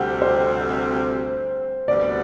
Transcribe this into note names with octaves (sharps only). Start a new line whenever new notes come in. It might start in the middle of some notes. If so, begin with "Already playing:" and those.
Already playing: D2 C3 G3 C4 F#5 G5
C5
D2 C3 G3 B3 D5